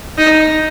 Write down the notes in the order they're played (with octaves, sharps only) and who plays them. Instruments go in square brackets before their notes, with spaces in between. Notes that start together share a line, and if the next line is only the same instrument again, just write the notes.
[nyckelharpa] D#4